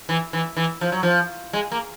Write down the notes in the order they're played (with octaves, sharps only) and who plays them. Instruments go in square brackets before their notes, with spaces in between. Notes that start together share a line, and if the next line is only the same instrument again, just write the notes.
[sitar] E3
E3
E3
F3
F#3
F3
G#3
A#3